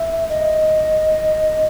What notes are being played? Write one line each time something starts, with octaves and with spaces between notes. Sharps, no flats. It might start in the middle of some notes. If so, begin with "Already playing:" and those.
Already playing: E5
D#5